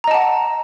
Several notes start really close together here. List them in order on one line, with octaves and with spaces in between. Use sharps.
A#5 D#5 A5 F#5